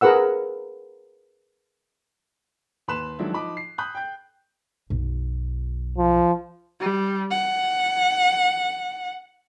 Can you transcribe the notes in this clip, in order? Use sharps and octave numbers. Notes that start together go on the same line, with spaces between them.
G#4 A#4 B4 F#5 E6
D#2 B4 B5 C6 F#6 E7
D#3 F3 F#3 G#3 D4 E4
F3 D#4 B5 D6
C7
B5 D#6 F#6 G6
G5 G6
B1 F#2
F3
G3
F#5